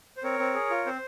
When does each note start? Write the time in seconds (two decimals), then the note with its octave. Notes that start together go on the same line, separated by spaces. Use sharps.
0.17 C5
0.23 C4 A#4 C#5
0.39 C4
0.54 G#4
0.70 F4
0.86 C4 C5